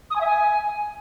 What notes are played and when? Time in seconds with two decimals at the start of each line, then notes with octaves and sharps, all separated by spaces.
0.10 D#6
0.15 G#5
0.21 E5
0.26 G#5